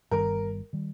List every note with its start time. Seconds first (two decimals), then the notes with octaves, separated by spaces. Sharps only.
0.11 G1 G2 D#3 G3 A#4
0.73 D#3 G3